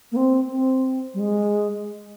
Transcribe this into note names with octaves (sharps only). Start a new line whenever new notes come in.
A#3
C4
C4
G3
G#3